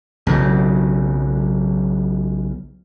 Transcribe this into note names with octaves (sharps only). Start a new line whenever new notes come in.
B1 C#3 F#3